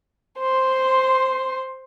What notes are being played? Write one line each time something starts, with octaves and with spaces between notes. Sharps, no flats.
C5 C6